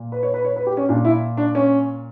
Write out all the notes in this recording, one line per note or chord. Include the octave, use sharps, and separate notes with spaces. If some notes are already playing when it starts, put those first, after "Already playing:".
Already playing: A#2
B4
C#5
B4
C#5
B4
G4
C#4
A#2 D4
E4
D4
C#4